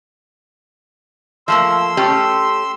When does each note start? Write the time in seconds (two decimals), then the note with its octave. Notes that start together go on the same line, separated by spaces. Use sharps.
1.48 F3 A3 A#3 C6 E6
1.97 A3 C#4 G4